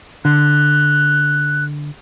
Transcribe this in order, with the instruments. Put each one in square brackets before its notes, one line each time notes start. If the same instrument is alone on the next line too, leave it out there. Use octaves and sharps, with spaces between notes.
[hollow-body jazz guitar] D3 [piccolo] F#6